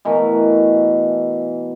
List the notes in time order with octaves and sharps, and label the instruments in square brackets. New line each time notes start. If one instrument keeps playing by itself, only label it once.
[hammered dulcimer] B2 E3 A3 A#4